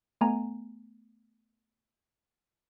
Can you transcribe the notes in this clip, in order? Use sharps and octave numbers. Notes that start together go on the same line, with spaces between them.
A3 B3 G#5 A#5